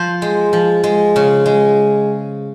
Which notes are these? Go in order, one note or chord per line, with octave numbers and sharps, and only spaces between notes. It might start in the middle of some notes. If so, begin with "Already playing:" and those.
Already playing: F3 C5
G#3
F3
G#3
C#3
G#3